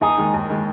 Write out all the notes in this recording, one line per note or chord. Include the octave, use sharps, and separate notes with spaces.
D#2 D#4 G#4
D#3 G#3
D#2
D#3 G#3